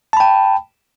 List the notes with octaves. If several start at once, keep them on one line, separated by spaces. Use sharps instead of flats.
G5 A5 B5